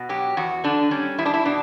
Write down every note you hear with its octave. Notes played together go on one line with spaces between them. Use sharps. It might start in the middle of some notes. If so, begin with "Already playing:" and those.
Already playing: B2
F#3 G4
E2 F#4
D3 D4
G3 C#4
E2 E4
D4
E4
B2 D4